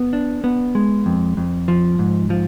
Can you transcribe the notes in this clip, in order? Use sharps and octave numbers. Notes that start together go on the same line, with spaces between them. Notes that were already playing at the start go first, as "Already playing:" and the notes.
Already playing: B3
D4
B3
G#3
F2
F2
F3
G#2
F3